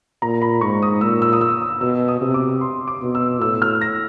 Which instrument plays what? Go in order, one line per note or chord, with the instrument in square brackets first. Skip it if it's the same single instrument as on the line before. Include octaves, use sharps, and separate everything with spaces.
[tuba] A#2 [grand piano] A#5
[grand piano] B5
[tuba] G#2 [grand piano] C#6
[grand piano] D#6
[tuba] A#2 [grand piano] E6
[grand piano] E6
D#6
E6
D#6
[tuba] B2 [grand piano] E6
[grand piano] D#6
[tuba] C3
[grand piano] D6
C6
D6
[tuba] B2
[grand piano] E6
[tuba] A2 [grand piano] E6
[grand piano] F6
A#6